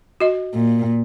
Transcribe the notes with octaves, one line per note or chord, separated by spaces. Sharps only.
F#4 D#5
A#2